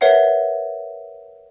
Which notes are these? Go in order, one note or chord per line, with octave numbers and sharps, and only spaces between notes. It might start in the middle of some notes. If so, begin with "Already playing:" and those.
A#4 B4 C#5 E5 F#5 C7